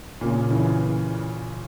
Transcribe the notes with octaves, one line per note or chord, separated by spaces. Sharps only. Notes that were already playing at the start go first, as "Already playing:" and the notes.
A#2 C#3
C#3 E3